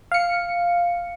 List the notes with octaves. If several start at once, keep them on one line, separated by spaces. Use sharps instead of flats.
F5 C#7